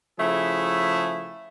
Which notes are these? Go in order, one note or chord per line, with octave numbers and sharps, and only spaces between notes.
C#3 F3 A3 E4 G#4